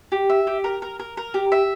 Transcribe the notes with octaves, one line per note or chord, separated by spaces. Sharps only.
G4
E5
G4
A#4
A#4
A#4
A#4
G4
E5